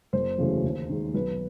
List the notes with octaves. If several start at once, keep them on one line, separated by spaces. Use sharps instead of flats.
F#1 C5
E2 C#3 F#3 A3
D#2
D#3 G#3
B1 B4